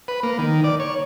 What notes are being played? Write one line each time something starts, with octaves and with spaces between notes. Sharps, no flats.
B4
A#3
D#3
D5
C#5